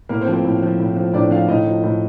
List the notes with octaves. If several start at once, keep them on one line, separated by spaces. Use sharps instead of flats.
A2 A#3 A#4
C4 C5
F3
C4 C5
A2
F3
A2
F3
A2 D4 D5
F3 F4 F5
A2 D#4 D#5
F3
A2